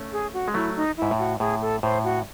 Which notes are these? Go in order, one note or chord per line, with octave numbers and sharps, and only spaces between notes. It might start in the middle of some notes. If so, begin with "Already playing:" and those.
Already playing: A3 C#4
G#4
F#4
G#3
F#3 A3 E4
D#4
G#2 E4
A2
F#4
A2 G#4
A4
A2 C5
F#4